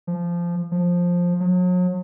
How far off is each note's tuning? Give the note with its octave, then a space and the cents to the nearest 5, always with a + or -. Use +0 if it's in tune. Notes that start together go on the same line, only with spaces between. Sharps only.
F3 -15
F3 +10
F#3 -40